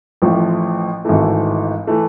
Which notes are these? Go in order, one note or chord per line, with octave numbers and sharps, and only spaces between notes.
A1 A2 F3
G#1 G#2 E3 A3
E3 A3